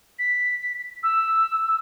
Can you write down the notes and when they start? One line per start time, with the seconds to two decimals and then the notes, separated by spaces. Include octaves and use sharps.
0.19 B6
1.03 E6